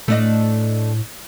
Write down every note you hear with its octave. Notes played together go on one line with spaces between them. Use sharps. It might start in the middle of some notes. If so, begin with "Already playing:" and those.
A2 A3 D4 D#5